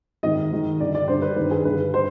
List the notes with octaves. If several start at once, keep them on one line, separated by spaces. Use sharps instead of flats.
G#2 D#3 D#5
G#2 D#3
G2 D3 D5
D5
G2 D3 C5
B4
G2 D#3 B4
G#4
G2 D3 B4
C5